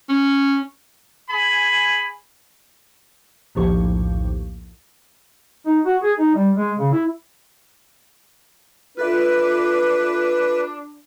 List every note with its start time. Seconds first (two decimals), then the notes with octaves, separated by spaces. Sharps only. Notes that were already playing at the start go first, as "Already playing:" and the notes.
0.09 C#4
1.29 G#4 G#5 B5
3.55 A#1 D#2 A2 F3 G4 C#6
5.66 D#4
5.85 F#4
6.03 G#4
6.18 D#4
6.35 G3
6.55 G#3
6.78 C#3
6.92 E4
8.97 D4 F4 A4 B4 E5